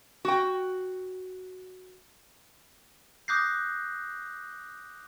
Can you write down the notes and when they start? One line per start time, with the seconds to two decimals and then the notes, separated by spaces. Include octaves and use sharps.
0.25 F#4 G5
3.28 D6 D#6 F#6 G6 A#6 C7